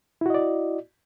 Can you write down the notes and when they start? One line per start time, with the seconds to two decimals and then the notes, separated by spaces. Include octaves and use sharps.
0.21 E4
0.26 F#4
0.30 D#5
0.34 D5